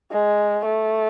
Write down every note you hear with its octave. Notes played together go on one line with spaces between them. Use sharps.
G#3
A3